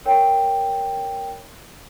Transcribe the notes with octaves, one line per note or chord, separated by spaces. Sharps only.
A#4 C#5 G5